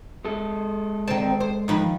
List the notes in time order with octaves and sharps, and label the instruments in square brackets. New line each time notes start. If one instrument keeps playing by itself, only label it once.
[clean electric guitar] G#3 A4
[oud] D#3 C4 [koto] A5
[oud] C5
[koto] D#3 F3 B4